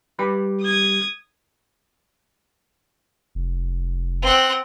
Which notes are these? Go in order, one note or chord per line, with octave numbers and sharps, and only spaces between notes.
G3 B4 B5
D#6 G#6
F1
C4 F#5